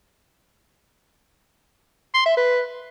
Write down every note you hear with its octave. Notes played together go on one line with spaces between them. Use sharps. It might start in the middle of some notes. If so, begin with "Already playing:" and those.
C6
E5
B4